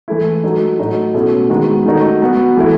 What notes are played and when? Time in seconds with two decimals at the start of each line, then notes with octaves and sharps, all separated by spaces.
0.08 E3 A3 E4
0.43 F#3 A3 D#4
0.79 A2 F#3 A3 D#4 F#4
1.14 B2 A3 C#4 E4
1.50 D#3 G#3 B3 F#4
1.85 D#3 A3 D#4 F#4
2.21 F#3 B3 F#4
2.57 E3 A3 E4